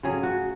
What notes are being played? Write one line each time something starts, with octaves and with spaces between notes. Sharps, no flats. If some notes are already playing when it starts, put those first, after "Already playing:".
C#3 F#3 A3 G#4
F#4